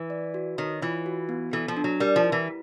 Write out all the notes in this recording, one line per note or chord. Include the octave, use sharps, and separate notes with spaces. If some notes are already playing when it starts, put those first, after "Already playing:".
Already playing: E3
D5
F#4
D#3 C#5
E3 F4
F#4
B3
E3 A4
F3
D4
F#3
G3 A#4
F3
E4
E3